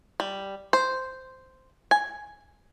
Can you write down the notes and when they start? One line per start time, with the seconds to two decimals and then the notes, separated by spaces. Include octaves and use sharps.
0.20 G3
0.73 C5
1.91 G#5